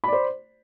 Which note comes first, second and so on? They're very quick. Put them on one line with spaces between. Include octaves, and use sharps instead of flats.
B5 D5 C5